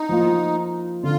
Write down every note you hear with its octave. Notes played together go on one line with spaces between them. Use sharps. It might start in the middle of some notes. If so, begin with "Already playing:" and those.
Already playing: D#4
F3 A#3 F4
D3 F4